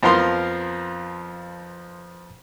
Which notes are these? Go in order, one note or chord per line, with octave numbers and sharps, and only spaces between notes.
F2 F3 B3 A#4 F5 C6